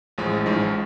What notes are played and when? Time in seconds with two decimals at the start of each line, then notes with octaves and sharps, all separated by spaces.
0.18 A1 A2 F3 G#3
0.46 A1 A2 F3 G#3 D#4